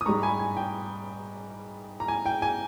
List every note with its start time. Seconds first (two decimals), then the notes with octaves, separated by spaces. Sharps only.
0.01 D#6
0.06 G#2 G3 A#5 C#6
0.22 G#5 B5
0.39 G#5
0.57 G5
2.00 A#5
2.08 G#5
2.26 G5
2.42 G#5